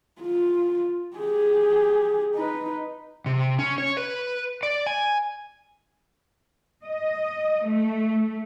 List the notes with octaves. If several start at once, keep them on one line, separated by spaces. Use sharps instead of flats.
F4
G4 G#4
D#4 B4
C3
C#4
C#5
B4
D5
G#5
D#5
A3